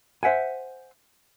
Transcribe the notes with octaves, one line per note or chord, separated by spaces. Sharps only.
C5 E5 F#5 G#5